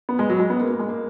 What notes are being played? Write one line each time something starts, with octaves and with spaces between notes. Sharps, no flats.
B3
G#3
F#3
G#3
B3
A#3
A#3
G#3
A#3